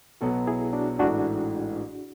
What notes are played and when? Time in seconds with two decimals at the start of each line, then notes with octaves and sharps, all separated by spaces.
0.21 B1 B2 F#3 B3 F#4 A4
0.47 E4 G#4
0.73 D4 F#4
0.99 A1 G#2 E3 A3 D4 F#4